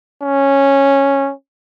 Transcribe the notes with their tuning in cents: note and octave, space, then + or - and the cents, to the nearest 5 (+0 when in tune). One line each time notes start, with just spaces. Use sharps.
C#4 -5